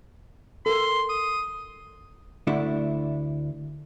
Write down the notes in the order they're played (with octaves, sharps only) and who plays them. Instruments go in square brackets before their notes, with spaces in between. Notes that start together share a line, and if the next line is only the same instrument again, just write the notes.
[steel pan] A4 A#4 [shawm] C6
[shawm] D#6
[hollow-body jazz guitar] D2 A3 D4 E4